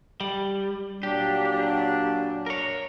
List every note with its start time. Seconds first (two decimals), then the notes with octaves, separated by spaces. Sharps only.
0.21 G3
1.03 A#2 F#3 D4 G4
2.46 A#4 C#5